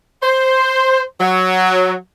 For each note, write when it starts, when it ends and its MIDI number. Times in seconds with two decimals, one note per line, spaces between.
0.23 1.02 72
1.20 1.94 54